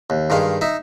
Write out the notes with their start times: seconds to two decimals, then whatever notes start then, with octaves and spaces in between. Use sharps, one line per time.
0.10 D#2
0.30 G2 D#3 G#3 F5
0.61 D#4 E5